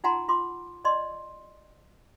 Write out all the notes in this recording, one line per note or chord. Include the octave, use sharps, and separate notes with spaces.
D#4 F4 F#5 G#5 A#5 C6
F4 C6 D6
D5 D#5 C6